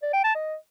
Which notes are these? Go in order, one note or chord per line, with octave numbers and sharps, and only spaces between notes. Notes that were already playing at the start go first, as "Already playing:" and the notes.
D5
G5
A5
D#5